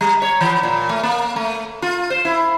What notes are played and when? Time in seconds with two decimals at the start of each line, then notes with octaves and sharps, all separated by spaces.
0.01 G3
0.22 C#5
0.41 E3
0.63 A#2
0.89 A3
1.03 A#3
1.36 A3
1.82 F4
2.10 C5
2.25 E4